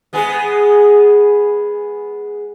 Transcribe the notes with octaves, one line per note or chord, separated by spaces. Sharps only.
G#3 B3 G#4